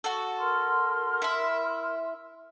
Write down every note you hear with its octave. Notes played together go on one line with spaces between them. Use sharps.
F#4 A4
A#4 C6 F6
E4 E5